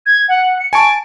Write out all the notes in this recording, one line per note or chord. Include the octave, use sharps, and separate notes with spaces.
G#6
F#5
C#7
G#5 A5 C#6 D7